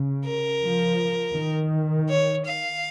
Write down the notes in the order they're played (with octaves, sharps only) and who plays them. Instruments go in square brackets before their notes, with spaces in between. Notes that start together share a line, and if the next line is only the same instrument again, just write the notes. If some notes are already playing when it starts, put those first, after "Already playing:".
Already playing: [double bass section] C#3
[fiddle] A#4
[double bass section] F3
D#3
[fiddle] C#5
F5